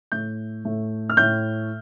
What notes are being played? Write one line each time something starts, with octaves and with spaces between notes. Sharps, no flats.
A2 A3 G6
A2 A3
F6
A2 A3 G6